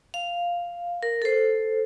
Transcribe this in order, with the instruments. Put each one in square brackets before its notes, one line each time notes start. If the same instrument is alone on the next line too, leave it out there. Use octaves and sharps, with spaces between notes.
[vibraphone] F5
A#4
A4 C5